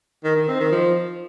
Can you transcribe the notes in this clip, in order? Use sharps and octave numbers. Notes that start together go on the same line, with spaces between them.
D#3
D#3
C4
D#3
F3